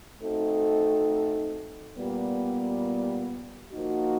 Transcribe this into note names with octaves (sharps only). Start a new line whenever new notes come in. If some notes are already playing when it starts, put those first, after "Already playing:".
A3 C4 D#4 F#4 A4
A#2 G3 B3
F3 A#3 D#4 F#4